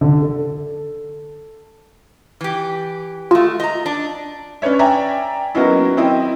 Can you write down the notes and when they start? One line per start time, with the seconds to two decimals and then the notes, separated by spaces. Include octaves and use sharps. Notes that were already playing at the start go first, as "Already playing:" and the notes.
0.01 D3
0.22 A4
2.41 E3 G4
3.31 G#3 A3 F4
3.60 D#5 A#5
3.86 D4
4.62 C#4 D4 B4 C#5 E5
4.79 D5 E5 G5 G#5 A#5
5.55 F#3 A#3 B3 C#4 D#4 E4
5.97 C4 E4 D#5 G5